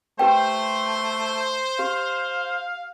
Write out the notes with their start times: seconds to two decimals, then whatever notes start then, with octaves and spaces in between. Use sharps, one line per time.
0.19 A3 G4 B4 C5 G5
1.79 G4 F5